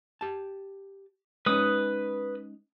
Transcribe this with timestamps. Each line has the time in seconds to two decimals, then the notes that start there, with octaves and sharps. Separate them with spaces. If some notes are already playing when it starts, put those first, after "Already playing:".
0.21 G4 A5
1.46 G#3 C#4 D#4 B4 D#6